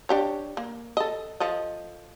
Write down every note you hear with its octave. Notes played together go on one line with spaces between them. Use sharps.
D4 G4 C#5
A#3
A4 D#5
F3 A4 D#5